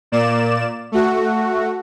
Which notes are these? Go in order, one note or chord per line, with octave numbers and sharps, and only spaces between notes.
A#2 A#3 D5 E7
A3 F#4